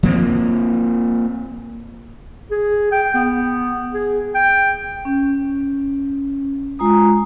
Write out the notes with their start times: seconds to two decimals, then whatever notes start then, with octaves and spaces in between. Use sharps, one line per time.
0.03 F3 A#3 C4
2.51 G#4
2.92 G5
3.15 B3
3.94 G#4
4.35 G5
5.05 C#4
6.79 G#3 F4 A#5 D#6